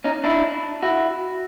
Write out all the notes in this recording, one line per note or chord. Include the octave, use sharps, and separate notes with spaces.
C#4 D#4
D4 E4
E4 F#4